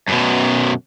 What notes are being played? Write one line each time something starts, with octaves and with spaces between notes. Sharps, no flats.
F#2 B2